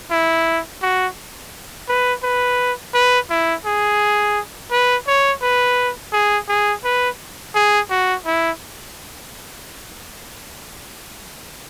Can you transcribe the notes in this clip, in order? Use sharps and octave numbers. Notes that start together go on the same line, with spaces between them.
E4
F#4
B4
B4
B4
E4
G#4
B4
C#5
B4
G#4
G#4
B4
G#4
F#4
E4